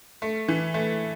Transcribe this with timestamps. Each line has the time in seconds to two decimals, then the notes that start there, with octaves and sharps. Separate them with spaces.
0.22 A3
0.48 E3
0.74 A3